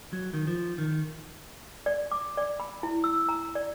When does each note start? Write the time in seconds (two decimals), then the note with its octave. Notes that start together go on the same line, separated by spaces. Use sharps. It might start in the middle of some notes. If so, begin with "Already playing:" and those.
0.13 F#3
0.34 D#3
0.47 F3
0.78 D#3
1.86 D5
2.11 D6
2.37 D5
2.60 B5
2.83 E4
3.04 E6
3.29 A#5
3.55 D5